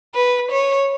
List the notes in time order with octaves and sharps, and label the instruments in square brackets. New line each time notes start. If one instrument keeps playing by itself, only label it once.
[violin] B4
C#5